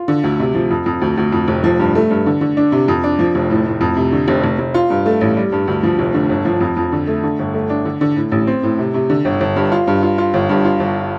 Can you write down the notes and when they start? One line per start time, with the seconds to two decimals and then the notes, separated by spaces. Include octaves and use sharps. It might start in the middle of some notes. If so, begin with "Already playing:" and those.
Already playing: F4
0.08 D3
0.24 D2
0.39 C3
0.55 F3
0.71 F2
0.86 F2
1.02 D2
1.18 D2
1.32 F2
1.48 F1
1.64 F3
1.79 G2
1.95 A3
2.10 G2
2.26 D3
2.41 D3
2.57 D4
2.72 C3
2.88 F2
3.04 D4
3.19 F3
3.35 F1
3.50 A2
3.66 A2
3.81 F2
3.97 C3
4.12 D3
4.28 F1
4.43 F1
4.59 F1
4.74 F4
4.90 G2
5.06 A3
5.21 A1
5.37 G3
5.52 G2
5.68 D2
5.83 F3
5.99 F1
6.14 D3
6.29 G1
6.45 F3
6.61 F2
6.77 F2
6.92 D3
7.07 A3
7.23 D3
7.39 G1
7.54 A3
7.70 D4
7.85 D3
8.01 D3
8.16 A2
8.32 A1
8.47 C4
8.63 A2
8.79 C3
8.94 C3
9.10 D3
9.25 G1
9.41 G1
9.56 G2
9.72 F4
9.87 G2
10.03 F4
10.18 F4
10.34 G1
10.49 G2
10.65 F4
10.80 G1